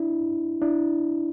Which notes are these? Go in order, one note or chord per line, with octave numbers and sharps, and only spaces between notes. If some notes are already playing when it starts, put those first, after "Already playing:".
Already playing: D4 E4
D4 E4